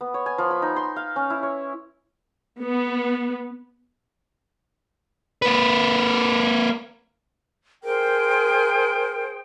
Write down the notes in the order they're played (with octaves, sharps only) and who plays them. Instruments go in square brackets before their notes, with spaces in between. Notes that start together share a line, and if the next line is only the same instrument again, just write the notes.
[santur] B3
C#5
G#5
F3
B5
D#4
C6
F5
C#4
E4
C#5
[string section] B3
[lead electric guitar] A#3 B4
[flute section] G#4 C5 G5 [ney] A#4